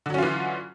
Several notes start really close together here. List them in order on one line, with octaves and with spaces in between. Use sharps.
D3 F#3 C#4 F4 E3